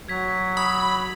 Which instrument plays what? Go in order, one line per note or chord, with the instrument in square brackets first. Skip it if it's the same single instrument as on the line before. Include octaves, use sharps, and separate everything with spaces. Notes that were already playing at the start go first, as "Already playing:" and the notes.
[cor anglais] F#3 [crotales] G#6 B6
[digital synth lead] B5 [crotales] D#6